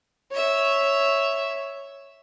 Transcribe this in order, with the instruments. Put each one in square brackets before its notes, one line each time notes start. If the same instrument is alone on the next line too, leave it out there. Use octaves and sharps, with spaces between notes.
[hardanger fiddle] C#5 E5